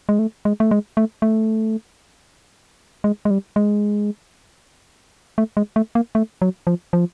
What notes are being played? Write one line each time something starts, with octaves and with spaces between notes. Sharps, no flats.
G#3
A3
G#3
A3
G#3
A3
A3
G#3
G#3
G3
G#3
A3
G#3
A3
A#3
A3
F#3
F3
F3